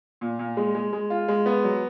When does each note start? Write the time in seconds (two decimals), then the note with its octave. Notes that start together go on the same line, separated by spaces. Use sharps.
0.21 A#2
0.39 A#2
0.57 G#3
0.75 G#3
0.93 G#3
1.10 F4
1.28 G#3
1.46 B3
1.64 F#3